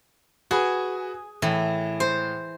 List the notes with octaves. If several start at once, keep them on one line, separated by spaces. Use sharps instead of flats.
F#4 G#4 B4
A2 E3
C5